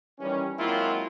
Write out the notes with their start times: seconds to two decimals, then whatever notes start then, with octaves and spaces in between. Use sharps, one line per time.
0.20 D#3 E3 G3 C#4
0.60 F#3 G#3 A#3 C4 E4 F4